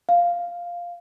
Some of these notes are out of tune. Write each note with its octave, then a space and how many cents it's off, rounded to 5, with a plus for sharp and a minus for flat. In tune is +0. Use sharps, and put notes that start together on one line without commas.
F5 +0